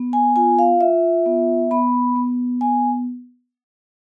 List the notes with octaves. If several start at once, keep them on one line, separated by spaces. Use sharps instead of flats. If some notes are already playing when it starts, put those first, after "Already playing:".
Already playing: B3
G#5
F4 G#5
F5
F4 E5
B3
B3 B5
B3
B3 G#5